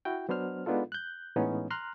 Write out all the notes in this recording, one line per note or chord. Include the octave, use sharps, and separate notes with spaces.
E4 F#4 G5
F#3 B3 D4 C5 F6
G#3 B3 D4 D#4 F4 A4
F#6 G6
A2 E3 G#3 B3 C#4 D#4
A#5 C6 F6 F#6